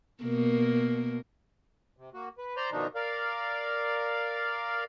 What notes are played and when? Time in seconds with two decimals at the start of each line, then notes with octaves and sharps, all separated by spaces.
0.23 B2 A#3 A#4
1.97 C3
2.14 A#3 F#4
2.38 B4
2.57 C5 D5 A#5 C6
2.72 B2 D#3 F3 D4 D#4
2.95 A#4 D5 F5